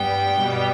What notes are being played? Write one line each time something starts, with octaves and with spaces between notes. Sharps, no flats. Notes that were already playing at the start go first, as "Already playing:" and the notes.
Already playing: G2 G3 B3 G5
B2 G3 B3